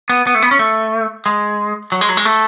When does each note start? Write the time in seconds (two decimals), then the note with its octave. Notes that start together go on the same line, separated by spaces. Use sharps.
0.09 B3
0.27 B3
0.35 A3
0.42 B3
0.51 C#4
0.59 A3
1.26 G#3
1.92 F#3
2.01 G#3
2.09 F#3
2.17 G#3
2.25 A3